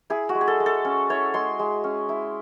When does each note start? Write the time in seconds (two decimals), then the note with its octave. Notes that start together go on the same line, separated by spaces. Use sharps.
0.10 E4 G#4
0.29 F#4
0.35 G#3
0.41 G#4
0.48 A4
0.60 G#3
0.66 A4
0.85 C#4
1.09 E4 C#5
1.34 G#3 C6
1.59 G#3
1.84 C#4
2.09 E4